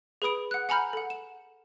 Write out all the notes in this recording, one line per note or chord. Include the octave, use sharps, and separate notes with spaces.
G#4 B4 B5 D#6 D7
F#5 F#6
F#5 G#5 A#5 B5 F6 G6
A4 F#5
E7